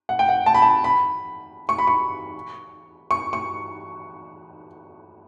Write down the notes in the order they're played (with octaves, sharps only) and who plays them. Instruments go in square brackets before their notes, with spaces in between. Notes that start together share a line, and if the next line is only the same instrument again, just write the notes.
[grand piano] F#5
G5
F#5
A5
B5
A5
B5
C#6
B5
C#6
C#6
C#6